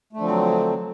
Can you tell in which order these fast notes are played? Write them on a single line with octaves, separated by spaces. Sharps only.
A3 D3 F3 C4 F#3